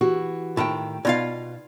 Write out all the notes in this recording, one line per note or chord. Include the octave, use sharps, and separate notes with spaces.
E3 F#4 G4
A2 D#3 F4 G5 A5
B2 D#4 F4 D5 F5